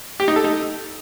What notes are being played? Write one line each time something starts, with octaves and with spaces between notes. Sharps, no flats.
G4
D#4
A4
D#4